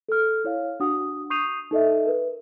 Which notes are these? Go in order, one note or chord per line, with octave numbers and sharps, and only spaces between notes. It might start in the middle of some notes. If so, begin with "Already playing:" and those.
A4 F6
E4 C#5 F5
D4 F#4 F#5 D#6
C#6 D#6 G6 C7 D#7 F7
D#4 A4 D#5 E5
A#4 B4